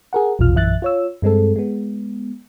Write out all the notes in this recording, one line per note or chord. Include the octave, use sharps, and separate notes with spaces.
G#4 A#4 F#5
A#1 E2 B2 F4 F6
A#1 F#2 E3 E5 F#6 A6
F4 C#5 E6
G2 G#3 C4 A4
G#3 B3